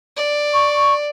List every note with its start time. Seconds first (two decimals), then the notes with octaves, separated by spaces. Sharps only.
0.17 D5
0.53 C#6